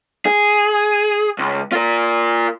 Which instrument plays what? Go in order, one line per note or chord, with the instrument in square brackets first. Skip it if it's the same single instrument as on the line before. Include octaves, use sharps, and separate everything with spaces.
[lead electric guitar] G#4
C#2
F4 A#4